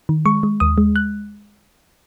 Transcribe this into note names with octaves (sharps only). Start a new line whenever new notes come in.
D#3
G#3 C#6
G#3
D#2 D#6
G#3
F#6